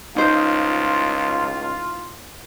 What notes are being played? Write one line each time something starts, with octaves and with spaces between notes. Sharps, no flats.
C#2 A2 D#4 F4 C5